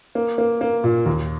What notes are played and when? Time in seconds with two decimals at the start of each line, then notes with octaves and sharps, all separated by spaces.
0.15 A#3
0.38 A#3
0.61 A#3
0.84 A#2
1.06 D#2